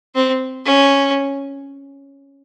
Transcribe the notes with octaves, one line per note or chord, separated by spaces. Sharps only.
C4
C#4